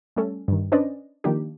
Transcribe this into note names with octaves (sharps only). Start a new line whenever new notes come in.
G3 A3 C#4 A4
G2 D#3
C#4 D4 B4 C5 D5 D#5
D#3 F3 A#3 D4 G4